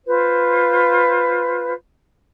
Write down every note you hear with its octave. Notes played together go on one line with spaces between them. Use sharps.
F4 B4 C5